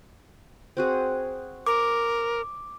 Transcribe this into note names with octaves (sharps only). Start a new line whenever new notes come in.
C4 F#4 G#4
A#4 D6